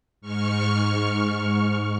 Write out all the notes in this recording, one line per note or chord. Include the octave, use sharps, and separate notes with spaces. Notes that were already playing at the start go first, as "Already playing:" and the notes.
G#2 C#6 F6